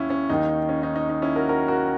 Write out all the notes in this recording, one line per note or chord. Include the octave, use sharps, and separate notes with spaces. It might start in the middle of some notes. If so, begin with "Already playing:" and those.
Already playing: D#2 C#4 E4
C#4
D#2 D#3 D#4
C#4
D#4
D#4
D#4
C#4 E4
F#4 A#4
F#4 A#4
F#4 A#4